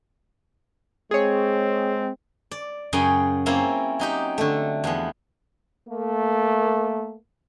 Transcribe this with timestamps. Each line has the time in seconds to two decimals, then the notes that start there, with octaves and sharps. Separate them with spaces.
1.11 G#3 C4 G#4 C#5
2.51 D5
2.93 F#2 C#3 G#4 G5 G#5
3.46 A#3 C4 C#4 E4 F4
3.99 F#3 D#4 G4
4.38 D3 A3
4.84 E2 F3 B3
5.88 A3 A#3